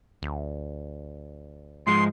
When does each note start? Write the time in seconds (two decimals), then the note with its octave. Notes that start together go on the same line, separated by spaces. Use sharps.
0.22 D2
1.87 G#2 F3 G#3 C6